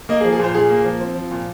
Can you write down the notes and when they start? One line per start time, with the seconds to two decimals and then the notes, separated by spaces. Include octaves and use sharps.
0.09 A#3 D#5
0.21 G#4
0.24 F3
0.33 G#4
0.39 A#2 C5
0.54 A#2 G#4
0.70 A#3
0.85 F3
1.01 C4
1.15 F3
1.31 A#2